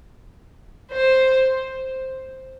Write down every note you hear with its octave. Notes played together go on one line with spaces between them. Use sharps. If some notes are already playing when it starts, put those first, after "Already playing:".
C5